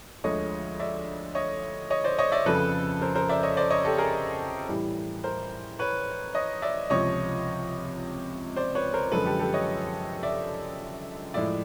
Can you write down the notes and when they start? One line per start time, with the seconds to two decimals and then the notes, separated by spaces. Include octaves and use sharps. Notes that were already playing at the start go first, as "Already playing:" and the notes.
0.24 D2 D3 F3 G#3 C#5 D#5
0.80 D5 E5
1.35 C#5 D#5
1.90 C#5 D#5
2.04 C5 D5
2.18 C#5 D#5
2.32 D5 E5
2.46 F2 C#3 F3 A4 B4
3.01 A#4 C5
3.15 A#4 C5
3.29 D5 E5
3.43 C#5 D#5
3.57 C5 D5
3.70 C#5 D#5
3.85 G4 A4
3.98 G#4 A#4
4.68 A2 E3 G3
5.24 A#4 C5
5.79 B4 C#5
6.35 C#5 D#5
6.62 D5 E5
6.90 C#2 C3 F3 C#5 D#5
8.57 C5 D5
8.75 B4 C#5
8.94 A#4 C5
9.12 F#2 D3 F3 G#3 A4 B4
9.25 G4 A4
9.39 G4 A4
9.54 C#5 D#5
10.23 D5 E5
11.34 A2 F3 G#3 D5 E5